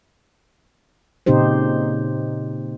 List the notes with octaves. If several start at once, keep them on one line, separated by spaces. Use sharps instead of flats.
A#2 C#3 C4 D#4 G4 C5